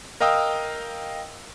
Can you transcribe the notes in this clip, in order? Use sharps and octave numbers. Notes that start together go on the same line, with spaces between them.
A#4 D#5 F5 G5 D#6 E6